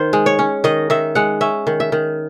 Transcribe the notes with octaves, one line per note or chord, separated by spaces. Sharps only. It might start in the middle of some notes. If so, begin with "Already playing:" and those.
Already playing: D#3 C5
G#3
C#5
C#4
D#3 D#5
D#3 E5
G#3 F#5
C#4 E5
D#3
E5
D#3